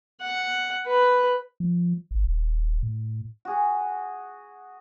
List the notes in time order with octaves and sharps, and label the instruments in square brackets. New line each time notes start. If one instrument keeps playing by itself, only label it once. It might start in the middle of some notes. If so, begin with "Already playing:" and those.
[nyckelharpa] F#5
B4
[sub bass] F3
G1
D#1
A2
[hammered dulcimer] F#4 G#4